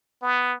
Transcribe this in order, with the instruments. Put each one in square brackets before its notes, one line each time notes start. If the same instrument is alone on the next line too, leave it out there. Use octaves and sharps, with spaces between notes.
[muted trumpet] B3